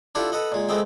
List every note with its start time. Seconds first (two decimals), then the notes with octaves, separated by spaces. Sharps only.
0.15 D4 E4 F4 G4 A4 F#5
0.32 A4 B4 D#5 F#5
0.52 A#2 G#3
0.69 G#3 A3 B3 C4 G5